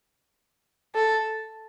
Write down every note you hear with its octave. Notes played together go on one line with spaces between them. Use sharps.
A4